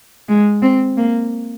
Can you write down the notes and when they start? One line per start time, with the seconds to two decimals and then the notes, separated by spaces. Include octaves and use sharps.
0.29 G#3
0.62 C4
0.97 A#3